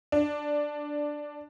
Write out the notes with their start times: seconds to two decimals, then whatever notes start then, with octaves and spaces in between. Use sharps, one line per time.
0.12 D4